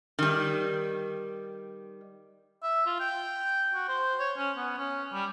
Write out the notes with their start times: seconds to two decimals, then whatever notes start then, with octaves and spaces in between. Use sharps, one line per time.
0.19 D#3 G3
2.63 E5
2.86 F4
3.00 G5
3.74 F#4
3.88 C5
4.20 C#5
4.37 C#4
4.57 B3
4.78 C#4
5.13 G3